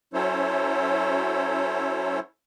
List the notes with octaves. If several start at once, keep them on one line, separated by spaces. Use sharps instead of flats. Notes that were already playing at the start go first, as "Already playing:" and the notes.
F#3 C#4 E4 A4 C5 C#5